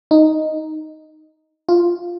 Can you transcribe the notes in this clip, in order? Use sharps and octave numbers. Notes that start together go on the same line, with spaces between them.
D#4
F4